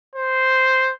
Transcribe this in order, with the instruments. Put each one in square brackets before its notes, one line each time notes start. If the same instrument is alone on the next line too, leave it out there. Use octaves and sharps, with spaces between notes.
[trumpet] C5